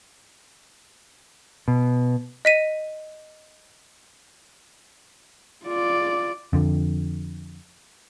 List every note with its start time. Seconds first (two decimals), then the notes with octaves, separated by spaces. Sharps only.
1.68 B2
2.45 D#5 B6 D#7
5.65 F4 D5
6.53 F2 D3